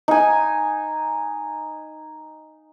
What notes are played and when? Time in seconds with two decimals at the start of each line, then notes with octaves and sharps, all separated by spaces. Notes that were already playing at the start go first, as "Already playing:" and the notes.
0.08 D#4 G#5